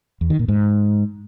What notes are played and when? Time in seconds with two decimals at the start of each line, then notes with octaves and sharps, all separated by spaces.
0.21 E2
0.30 D#3
0.39 A#2
0.48 G#2